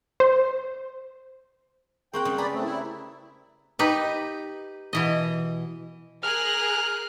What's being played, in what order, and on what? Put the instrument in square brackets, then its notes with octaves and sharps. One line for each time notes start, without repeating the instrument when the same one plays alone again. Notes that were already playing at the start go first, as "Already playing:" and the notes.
[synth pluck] C5
[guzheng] A#3 C4 F#5 [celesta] G#4 C#6 [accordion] G5
[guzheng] C#3 G3
[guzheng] G#4 B4 [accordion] D5 B5 [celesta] A#5
[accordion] A3 C4
E4
[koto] D#4 G4 B4
B2 E3 D#5
[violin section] G#4 A#4 F#6 [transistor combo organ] F6